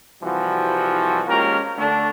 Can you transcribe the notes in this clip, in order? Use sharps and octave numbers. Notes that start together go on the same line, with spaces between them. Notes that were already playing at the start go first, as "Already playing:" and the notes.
C2 E3 F3 G3 F#4
G#3 A#3 C#4 F4 G4 A#4
D3 A3 D4